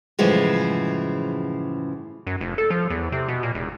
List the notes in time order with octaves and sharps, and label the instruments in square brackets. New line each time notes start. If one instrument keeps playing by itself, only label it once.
[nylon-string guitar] F#2 A2 C#3 E3 F3 G#3
[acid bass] F#2
F1
A4
F3
E2
C3
B2
A#2
E1